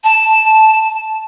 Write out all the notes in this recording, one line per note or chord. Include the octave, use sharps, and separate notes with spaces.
A5